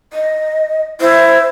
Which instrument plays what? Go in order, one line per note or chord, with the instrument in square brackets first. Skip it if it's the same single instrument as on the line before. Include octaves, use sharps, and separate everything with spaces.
[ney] D#5
[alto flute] E4 [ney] C5